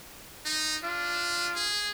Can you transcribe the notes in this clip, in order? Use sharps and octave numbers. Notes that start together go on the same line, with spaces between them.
D#4
D4 F4
G#4